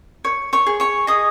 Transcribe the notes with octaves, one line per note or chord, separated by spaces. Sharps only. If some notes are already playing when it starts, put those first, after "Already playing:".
C#5
C#5 C#6
G#4
C#5 C#6
G#4 D#5 D#6